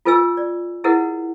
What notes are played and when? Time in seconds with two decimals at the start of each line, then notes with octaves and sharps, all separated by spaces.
0.05 F4 A4 B4 D#5 G#5 E6
0.37 D5
0.84 E4 G#4 A#4 B4 D#5 F#5